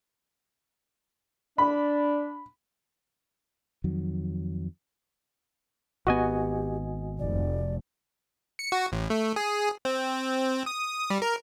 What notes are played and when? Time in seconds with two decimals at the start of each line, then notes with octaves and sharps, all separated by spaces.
1.58 D4 D5 B5
3.84 F2 D#3 F#3
6.07 G#1 B3 F#4 G4 D#5 G#5
7.19 F1 D5
8.59 C#7
8.72 F#4
8.92 A1
9.10 A3
9.36 G#4
9.85 C4
10.66 D#6
11.10 G3
11.22 A#4